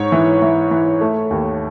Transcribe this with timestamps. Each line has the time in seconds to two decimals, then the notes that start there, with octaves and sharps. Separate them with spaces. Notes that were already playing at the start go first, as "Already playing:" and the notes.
Already playing: G#2 C#5
0.12 E3
0.42 E3
0.71 E3
1.01 A3
1.31 D#2